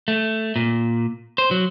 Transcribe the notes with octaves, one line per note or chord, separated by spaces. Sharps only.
A3
A#2
C5
F#3